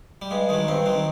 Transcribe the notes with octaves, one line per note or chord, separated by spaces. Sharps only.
G3
G2 G#3
D#3 F#3 G#3
G2 C4
D#3 F#3